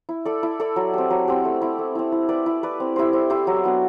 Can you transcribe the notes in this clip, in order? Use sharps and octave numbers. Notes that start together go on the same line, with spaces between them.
E4
A4 D5
E4
A4 D5
F#3
C4 G4
F#3
C4 G4
A3
C4 E4
A3
C4 E4
E4
B4 D5
E4
B4 D5
C4
E4 G4 C5
C4
E4 G4 C5
F#3
B3 D4 F#4